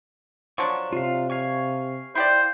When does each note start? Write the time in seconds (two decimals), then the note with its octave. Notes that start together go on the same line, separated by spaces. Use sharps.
0.58 F3 F#3 D4 C#6
0.93 C3 F4 F5
1.30 F5 G#5 C#6
2.15 E4 G4 C5 D5